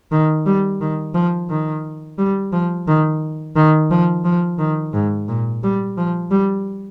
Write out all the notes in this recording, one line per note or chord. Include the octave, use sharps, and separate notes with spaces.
D#3
G3
D#3
F3
D#3
G3
F3
D#3
D#3
F3
F3
D#3
G#2
A#2
G3
F3
G3